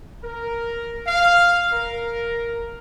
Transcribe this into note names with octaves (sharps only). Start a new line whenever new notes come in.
A#4
F5
A#4